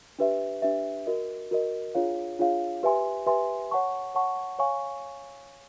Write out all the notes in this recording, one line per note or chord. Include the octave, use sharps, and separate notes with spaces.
D4 G4 B4 E5
D4 G4 B4 E5
F#4 A#4 D#5
F#4 A#4 D#5
D4 F4 G#4 C#5 F5
D4 F4 G#4 C#5 F5
G4 B4 E5 G#5 C6
G4 B4 E5 G#5 C6
C#5 F#5 A5 C#6
C#5 F#5 A5 C#6
C#5 F5 G#5 C#6